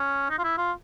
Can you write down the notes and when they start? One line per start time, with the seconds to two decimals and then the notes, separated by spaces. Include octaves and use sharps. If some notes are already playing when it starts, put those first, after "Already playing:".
Already playing: C#4
0.30 D#4
0.38 F4
0.44 E4
0.58 F4